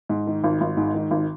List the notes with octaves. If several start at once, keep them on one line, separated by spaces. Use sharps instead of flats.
G#2
D#3
G#1
G#1
G#2
D#3
G#1